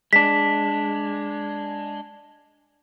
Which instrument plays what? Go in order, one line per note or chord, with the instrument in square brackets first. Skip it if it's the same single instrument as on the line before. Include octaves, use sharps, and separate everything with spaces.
[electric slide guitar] G#3 D4 [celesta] B6